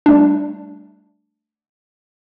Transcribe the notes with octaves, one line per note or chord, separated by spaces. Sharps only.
G3 A3 D4